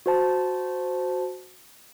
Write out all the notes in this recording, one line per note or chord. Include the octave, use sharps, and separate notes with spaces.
F#4 C5 A5